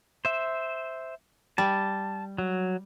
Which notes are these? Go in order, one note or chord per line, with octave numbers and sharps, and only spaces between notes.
C5 E5
G3 A5
F#3